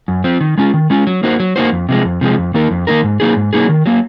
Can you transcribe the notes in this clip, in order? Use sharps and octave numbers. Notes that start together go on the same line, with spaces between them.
F#2
F3 C4
D#3
G#3 C#4 F4
D#3
G#3 C#4 F4
F#3
A#3 D#4 F#4 C5
F#3
A#3 D#4 F#4 C5
F2
C3 F3 G#3
F2
C3 F3 G#3
F2
D#3 A#3 D#4 A#4
F2
D#3 A#3 D#4 A#4
G#2
F#3 A#3 D#4 G#4
G#2
F#3 A#3 D#4 G#4
D#3
F#3 A#3